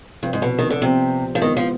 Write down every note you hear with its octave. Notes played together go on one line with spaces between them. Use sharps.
G2 C3 F3 C4 F4 C5
G#2
B2
D#3
D3
C3 F3 B3 F4 C5
F3
D#3 G#3 B3 F4
F3